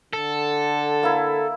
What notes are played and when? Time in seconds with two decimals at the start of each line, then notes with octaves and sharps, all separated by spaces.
0.13 D3 A4
1.03 A#3 E4